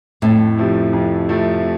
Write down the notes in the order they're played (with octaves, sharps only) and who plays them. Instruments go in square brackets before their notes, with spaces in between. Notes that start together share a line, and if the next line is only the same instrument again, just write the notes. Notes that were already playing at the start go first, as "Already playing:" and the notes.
[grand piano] F2 [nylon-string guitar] A2
[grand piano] C3 F3 A3
F2
C3 F3 A3